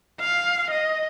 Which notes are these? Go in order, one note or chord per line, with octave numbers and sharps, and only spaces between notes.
F5
D#5